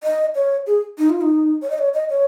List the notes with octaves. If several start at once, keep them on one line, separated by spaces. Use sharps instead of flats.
D#5
C#5
G#4
D#4
F4
D#4
C#5
D#5
C#5
D#5
C#5